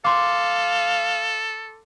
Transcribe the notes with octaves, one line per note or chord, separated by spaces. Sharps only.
A4 F5 C6 D6